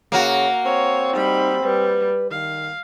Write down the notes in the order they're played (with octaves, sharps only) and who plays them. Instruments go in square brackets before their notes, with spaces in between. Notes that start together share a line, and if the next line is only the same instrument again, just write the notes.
[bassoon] C#3 [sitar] A#3 F#4
[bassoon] C4 [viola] C#5
[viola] G3 B5 [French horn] D#4
[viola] G3 [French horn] B4
[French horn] D#3 [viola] F5